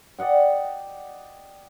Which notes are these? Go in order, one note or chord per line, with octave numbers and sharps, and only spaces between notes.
D5 D#5 F#5 G5